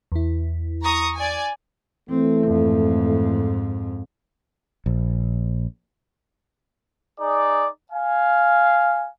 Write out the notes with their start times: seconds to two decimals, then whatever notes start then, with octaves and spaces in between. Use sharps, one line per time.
0.12 E2 E4
0.83 A#5 C#6 D#6
1.16 D5 G#5
2.10 E3 A3 C4
2.47 F2 G#2
4.86 A#1
7.19 D#4 G#4 D5
7.92 F5 G#5